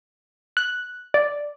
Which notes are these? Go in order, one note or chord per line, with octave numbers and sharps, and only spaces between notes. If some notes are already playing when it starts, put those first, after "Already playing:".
F#6
D5